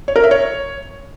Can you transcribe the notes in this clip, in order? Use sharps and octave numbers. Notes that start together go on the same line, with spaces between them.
C#5
A#4
E5
C#5